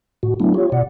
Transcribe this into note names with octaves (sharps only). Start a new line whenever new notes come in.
A2 F#4
F#3 A3 B3 D4 E4
F4 G4 C#5
B2 D5 F#5